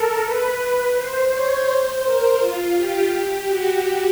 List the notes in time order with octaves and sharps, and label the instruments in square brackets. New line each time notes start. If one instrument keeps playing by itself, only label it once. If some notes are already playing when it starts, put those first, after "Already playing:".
Already playing: [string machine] A4 A#4
B4
C5
C#5
C5
A#4
F4
G4
F#4